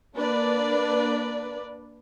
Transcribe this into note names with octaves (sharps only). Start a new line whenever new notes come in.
A#3 D4 B4 D5